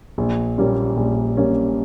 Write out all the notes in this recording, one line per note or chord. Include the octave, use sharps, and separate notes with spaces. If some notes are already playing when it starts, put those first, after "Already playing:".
A#1
A#2 G3 A#3 C#4
A#1
A#2 G3 A#3 C#4